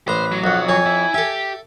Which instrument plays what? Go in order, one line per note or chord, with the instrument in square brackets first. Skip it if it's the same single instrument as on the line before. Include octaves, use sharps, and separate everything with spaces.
[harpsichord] A1 A#5 [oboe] B4 [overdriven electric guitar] C5
[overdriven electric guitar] F#3
[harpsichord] B1 F2 [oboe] F#5
[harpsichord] F2 C#5 [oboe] G#5
[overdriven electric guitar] E4 E5
[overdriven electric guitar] G4 [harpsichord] A4 E5